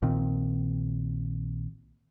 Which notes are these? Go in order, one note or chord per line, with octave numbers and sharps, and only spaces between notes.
A#1 A#2 D#3 C4